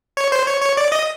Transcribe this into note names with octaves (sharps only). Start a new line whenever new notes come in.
C#5
C5
C#5
C#5
D5
D#5